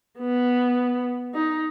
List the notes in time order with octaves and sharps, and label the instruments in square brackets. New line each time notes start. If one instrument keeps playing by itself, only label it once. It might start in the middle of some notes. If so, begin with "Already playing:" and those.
[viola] B3
D#4